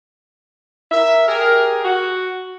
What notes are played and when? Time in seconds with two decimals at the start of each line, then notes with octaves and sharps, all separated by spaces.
0.91 A#4 E5
1.26 G4 G#4 A#4
1.83 F#4